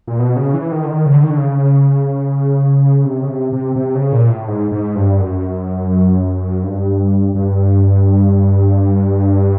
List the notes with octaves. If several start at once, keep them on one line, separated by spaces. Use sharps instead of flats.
A#2
B2
C#3
E3
D#3
D3
D#3
C#3
D3
D#3
D3
C#3
C3
C#3
C3
C3
C3
C#3
A#2
A2
G#2
G#2
G2
F#2
G2
G2